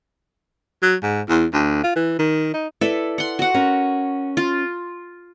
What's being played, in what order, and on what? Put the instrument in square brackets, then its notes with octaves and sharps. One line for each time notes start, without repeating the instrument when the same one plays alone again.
[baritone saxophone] F#3
G#2
E2
D2
F4
E3
D#3
D#4
[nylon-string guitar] E4 B4 D5 [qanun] A4
[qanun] F#5 C6
F#4 F#5
[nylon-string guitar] C#4 A#4
[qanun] F4